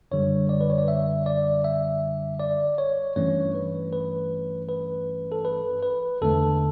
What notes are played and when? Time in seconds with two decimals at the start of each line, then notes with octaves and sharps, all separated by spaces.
0.11 F#2 D3 G3 C#5
0.49 D5
0.61 B4
0.70 C#5
0.78 D5
0.88 E5
1.26 D5
1.64 E5
2.40 D5
2.78 C#5
3.16 G2 E3 A3 C#4 C#5
3.55 B4
3.93 B4
4.69 B4
5.32 A4
5.45 B4
5.83 B4
6.21 E2 D3 A3 A4